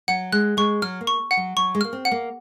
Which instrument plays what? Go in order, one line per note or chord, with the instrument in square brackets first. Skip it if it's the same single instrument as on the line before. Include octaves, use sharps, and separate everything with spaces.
[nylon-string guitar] F#3 [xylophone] F#5
[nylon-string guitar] G#3 [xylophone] F#6
[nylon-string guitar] G#3 [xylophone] C#6
[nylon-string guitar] F#3 [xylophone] F6
[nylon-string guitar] A#3
[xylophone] C#6
F#5
[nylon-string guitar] F#3
[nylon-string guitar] F#3 [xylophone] C#6
[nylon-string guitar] G#3
[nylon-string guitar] A#3 [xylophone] F6
[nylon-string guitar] C4
[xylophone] F#5
[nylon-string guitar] A#3